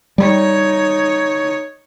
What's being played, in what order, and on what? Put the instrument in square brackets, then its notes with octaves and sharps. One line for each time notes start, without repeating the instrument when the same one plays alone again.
[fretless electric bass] G3 [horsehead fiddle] D#4 C#5